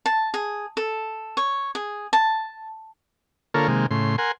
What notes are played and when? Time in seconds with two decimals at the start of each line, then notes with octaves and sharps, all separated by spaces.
0.06 A5
0.34 G#4
0.77 A4
1.37 C#5
1.75 G#4
2.13 A5
3.54 D3 A#3 F4 A4 A#4 C#5
3.68 C3 D#3 G#3 A#3
3.91 A2 C#3 C6
4.18 A#4 F#5 G#5 C6